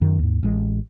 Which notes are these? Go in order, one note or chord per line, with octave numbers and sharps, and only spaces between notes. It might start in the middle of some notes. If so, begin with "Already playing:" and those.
F#2 D#3
D#2 G#2
A1 G#3